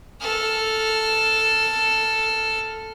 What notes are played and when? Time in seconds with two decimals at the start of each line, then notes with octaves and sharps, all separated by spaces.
0.21 A4 F6